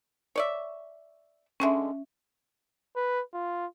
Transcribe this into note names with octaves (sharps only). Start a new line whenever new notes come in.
C#5 D5 E5
B2 D3 G#3 C#4 E5
B4
F4